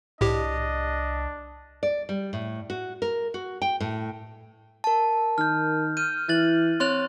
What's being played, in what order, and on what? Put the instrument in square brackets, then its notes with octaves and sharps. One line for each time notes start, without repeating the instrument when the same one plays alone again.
[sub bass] C2 [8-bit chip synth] A2 G4 [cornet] D4 [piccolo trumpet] D#5
[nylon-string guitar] D5
G3
A2
F#4
A#4
F#4
G5
A2
[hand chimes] A#4 A5
[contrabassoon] D#3 [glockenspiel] F6 G6
[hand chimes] F6 G6 [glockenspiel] D#7
[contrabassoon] E3 [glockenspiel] F#6 A6 F#7
[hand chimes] C4 C#5 A6 [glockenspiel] C6 F#6 F7